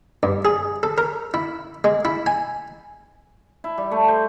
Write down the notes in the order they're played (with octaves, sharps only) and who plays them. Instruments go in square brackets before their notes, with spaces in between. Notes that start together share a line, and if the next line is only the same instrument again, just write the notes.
[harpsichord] G2
G#4
A4
A#4
E4
G#3
E4
G#5
[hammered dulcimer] E4
G3
A3
C5